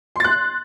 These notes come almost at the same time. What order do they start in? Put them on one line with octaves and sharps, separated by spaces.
C6 A6 F#6